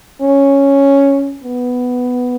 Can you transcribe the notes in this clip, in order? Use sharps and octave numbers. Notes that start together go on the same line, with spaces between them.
C#4
B3